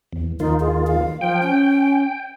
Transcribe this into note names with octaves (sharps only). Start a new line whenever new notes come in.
E2
D#2 D#3 D#4 F4
G#4
F5
F3 G5
C#4